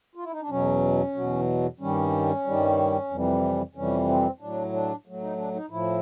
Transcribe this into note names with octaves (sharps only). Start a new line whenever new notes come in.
F4
E4
D#4
D4
E2 B2 F#3 C#4
E2 B2 F#3
G2 D#3 G3 C#4
G2 D#3 G3
F2 C3 E3 G3
F2 C3 E3 G3 C#4
C4
A2 F#3 D4
D4
A2 F#3
D#4
D4
D#4
A2 F3 E4